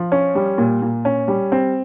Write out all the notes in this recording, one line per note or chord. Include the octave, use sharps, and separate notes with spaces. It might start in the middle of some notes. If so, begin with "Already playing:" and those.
Already playing: F3
C#4
G3
A#2
A#2
C#4
G3
C4